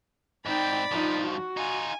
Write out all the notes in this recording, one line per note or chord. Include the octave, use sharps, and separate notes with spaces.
G#2 C4 D#4 D5 G5 B5
G2 F3 D#4 F4
F#4
D#4 F4 G#5